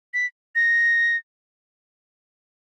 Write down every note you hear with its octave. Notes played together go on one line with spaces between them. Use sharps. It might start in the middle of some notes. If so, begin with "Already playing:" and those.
B6
A#6